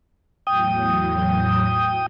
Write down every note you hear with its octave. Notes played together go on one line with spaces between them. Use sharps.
E2 A2 F#3 G5 D#6